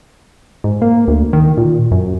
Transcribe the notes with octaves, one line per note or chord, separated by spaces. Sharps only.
G#2
A#3
D2
D#3
A#2
F#2